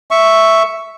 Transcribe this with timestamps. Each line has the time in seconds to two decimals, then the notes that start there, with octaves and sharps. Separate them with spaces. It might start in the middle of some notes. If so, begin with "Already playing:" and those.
0.11 E5 C#6